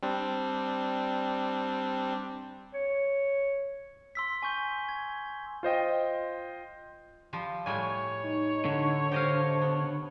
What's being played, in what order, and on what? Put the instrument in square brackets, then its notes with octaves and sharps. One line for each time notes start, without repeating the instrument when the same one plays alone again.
[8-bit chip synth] G3 C4 D4
[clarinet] C#5
[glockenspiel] C6 E6 B6
G#5 C#6 G6 G7
G#6
[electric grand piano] F4 C5 D#5 G5
[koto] F3 G3
[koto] A2 G3 G#5 [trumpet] C#5
[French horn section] D#4
[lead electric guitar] D3
[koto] G4 D#5 F5 [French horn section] C5
[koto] B3